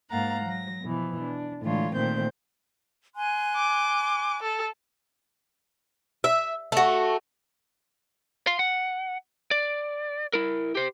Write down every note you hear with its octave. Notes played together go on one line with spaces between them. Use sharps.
G#2 A#3 F5 F#5 A#5 A6
F#3 A#6
B2 E3 F3
D4
A2 D3 E3 G#3 F4 C#5
A#2 D#3 A3 C4 C5 G6
G#5 C6 F#6
D6
A4
E5
A3 F#4
F5 C6
F#5
D5
E4 A#4
G4 C5